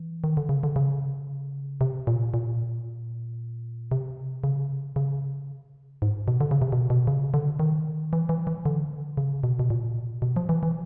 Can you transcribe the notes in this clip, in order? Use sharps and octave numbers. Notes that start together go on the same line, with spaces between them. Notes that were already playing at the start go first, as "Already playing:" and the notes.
Already playing: E3
D#3
D3
C#3
D3
C#3
C3
A#2
A#2
C3
C#3
C#3
G#2
B2
D3
C#3
C3
B2
B2
C#3
D3
D#3
E3
E3
E3
D3
C#3
B2
B2
A#2
B2
F3
E3
E3